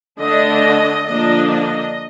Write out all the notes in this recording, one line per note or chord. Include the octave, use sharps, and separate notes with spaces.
D3 A3 D4 D#5
D3 F3 A#3 D4 D#5
D#5